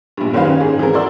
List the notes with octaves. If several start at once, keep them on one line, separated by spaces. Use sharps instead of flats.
A#1 G2
F#1 D#3 C#4 G4 B4 F5
C#4
G#2 G#4
E3 C4 G#4 A#4
E4 F#4 A#4 D5 C6 E6